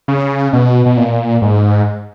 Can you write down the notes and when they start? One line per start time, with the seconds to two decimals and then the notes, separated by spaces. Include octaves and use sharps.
0.08 C#3
0.53 B2
0.86 B2
0.97 A#2
1.42 G#2